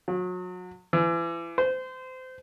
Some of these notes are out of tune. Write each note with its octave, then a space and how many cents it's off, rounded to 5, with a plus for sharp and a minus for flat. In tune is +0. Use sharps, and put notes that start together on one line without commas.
F#3 -30
E3 +35
C5 -25